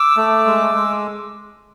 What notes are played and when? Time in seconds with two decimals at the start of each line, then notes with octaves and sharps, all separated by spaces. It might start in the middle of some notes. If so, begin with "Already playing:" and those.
Already playing: D6 E6
0.17 A3
0.46 G#3
0.75 G#3